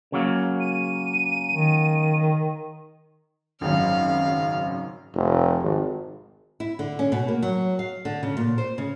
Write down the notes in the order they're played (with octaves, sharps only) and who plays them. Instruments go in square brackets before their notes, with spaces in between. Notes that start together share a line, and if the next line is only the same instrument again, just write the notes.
[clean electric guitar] C#3 F#3 A#3
[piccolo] D#7
[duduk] D#3
[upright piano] G#1 F#2 [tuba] C#3 [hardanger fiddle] F5
[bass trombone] F1
G#1
[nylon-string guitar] E4
D3
C#4
B2
A#3
F#3
F5
D3
C#3
A#2
C5
C#3